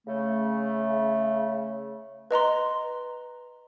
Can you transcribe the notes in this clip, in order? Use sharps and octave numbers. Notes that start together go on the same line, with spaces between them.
C#3 A3
B4 D#5 A#5 C6